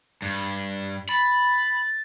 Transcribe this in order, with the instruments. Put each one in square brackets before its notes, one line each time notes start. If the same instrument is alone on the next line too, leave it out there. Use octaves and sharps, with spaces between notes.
[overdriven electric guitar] G2
[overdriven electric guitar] B5 [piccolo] A6